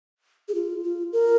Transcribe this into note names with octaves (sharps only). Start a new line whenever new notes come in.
G#4
F4
F4
A#4